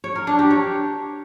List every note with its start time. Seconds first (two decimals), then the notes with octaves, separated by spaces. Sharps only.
0.04 C#5
0.15 A#4
0.27 D4
0.39 G4
0.50 C#5